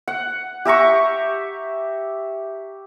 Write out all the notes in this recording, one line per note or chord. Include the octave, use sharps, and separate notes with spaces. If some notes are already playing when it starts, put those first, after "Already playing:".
F#5
G4 E5 A#5 C#6